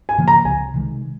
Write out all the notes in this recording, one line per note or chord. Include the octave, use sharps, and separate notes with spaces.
G#5
C#3 F3 A#3
A#5
C2 G#5
C3 D#3 G#3